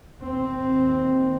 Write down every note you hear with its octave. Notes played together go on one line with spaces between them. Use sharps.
D#2 C4